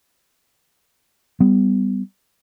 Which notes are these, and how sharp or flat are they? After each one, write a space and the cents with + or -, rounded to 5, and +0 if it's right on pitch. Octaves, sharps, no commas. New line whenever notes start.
G3 +0 B3 +25